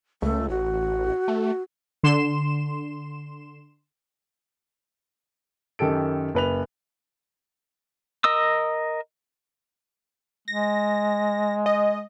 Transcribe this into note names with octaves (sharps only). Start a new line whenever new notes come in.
C#2 A3
A1 F#4
A3
D3 C6 E7
F#2 D#3 G4 A4 D7
F#1 B4 F7
A#4 D#5 D#6 E6
G#3 A#6
D#5